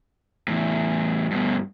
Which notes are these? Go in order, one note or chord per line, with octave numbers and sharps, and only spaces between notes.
E2 A2
G2 B2